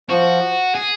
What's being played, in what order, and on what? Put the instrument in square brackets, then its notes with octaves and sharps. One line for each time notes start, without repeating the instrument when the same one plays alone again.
[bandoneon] F3 [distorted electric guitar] F#4
[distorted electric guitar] G#4